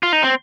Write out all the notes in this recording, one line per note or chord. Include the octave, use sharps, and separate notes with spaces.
F4
D#4
C4